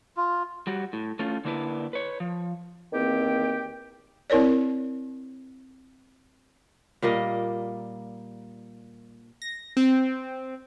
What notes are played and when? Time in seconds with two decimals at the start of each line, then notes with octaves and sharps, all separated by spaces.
0.17 F4
0.67 G3 F#4
0.93 A2
1.19 A3 C#4 F4
1.45 D3 A#3 D4 E4 B4
1.93 B4 C#5
2.20 F3
2.93 E2 D#3 A#3 C4 G4 G5
4.30 C4 E4 A#4 C#5 D5
7.02 A#2 G3 A#3 D#5
9.42 A#6
9.77 C4